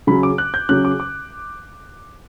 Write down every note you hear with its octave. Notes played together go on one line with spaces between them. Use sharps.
C#3 F#3 C#4 B5
D6
F#6
G6
C#3 F#3 C#4 F#6
D6
D6